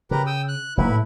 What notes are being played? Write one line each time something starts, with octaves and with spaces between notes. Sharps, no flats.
C#3 G4 A#4 B4
G5 D#6 E6
F#6
F1 F#3 A#3 E4 B4
A2